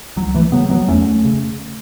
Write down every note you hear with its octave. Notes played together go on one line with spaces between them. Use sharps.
C#2 F#3
E3 A3
C#3 F#3 B3
F#3 B3
E2 A3 C#4
C#3